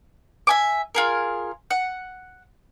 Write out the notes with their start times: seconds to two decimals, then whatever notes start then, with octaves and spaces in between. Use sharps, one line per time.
0.47 E5 G#5 D6
0.95 F4 G#4 A#4
1.70 F#5